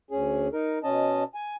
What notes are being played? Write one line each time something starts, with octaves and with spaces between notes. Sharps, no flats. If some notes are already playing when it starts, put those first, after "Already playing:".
D2 C#4 G#4
D#4 A#4
B2 C#4 D#5 A5
G#5